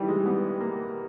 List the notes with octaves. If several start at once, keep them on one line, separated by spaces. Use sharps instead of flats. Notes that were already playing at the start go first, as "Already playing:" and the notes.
Already playing: D#3 E3 G3
G#3
B3
A#3